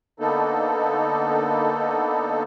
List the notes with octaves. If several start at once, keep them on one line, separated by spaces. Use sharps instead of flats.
D3 A#3 B3 D#4 A4